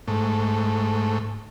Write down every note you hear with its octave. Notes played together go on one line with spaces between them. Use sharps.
G#2 A3